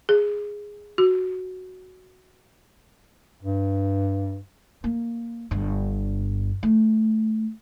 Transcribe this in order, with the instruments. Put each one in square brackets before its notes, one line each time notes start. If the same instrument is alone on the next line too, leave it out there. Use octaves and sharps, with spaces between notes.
[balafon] G#4
F#4
[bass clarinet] G2
[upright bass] A#3
G1 G2
A3